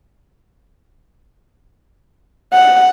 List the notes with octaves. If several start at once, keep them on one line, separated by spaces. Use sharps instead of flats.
F#5